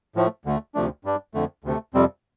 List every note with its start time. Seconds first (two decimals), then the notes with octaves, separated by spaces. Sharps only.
0.16 A2 F3 A3
0.46 D2 D3 A3
0.75 D2 C3 F3 A3 D4
1.05 G2 G3 D4
1.34 F2 D3 A3
1.64 D2 C3 A3
1.94 F2 C3 G3 C4